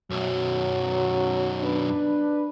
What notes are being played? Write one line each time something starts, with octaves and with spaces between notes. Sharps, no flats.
B1 F#2 F#3
D4 B4